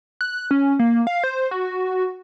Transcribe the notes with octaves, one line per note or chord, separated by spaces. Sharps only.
F#6
C#4
A#3
F5
C5
F#4